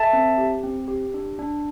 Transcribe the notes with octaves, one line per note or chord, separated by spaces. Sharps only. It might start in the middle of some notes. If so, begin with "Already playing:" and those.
Already playing: A4 E5 A5
C4
G4
C4
G4
D4
D4